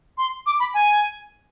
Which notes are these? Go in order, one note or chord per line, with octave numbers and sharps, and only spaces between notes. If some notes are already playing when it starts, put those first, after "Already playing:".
C6
D6
B5
G#5